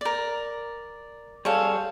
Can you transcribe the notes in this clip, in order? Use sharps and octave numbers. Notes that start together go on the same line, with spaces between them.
A#4 D5
G3 G#4 A4 C#5 F5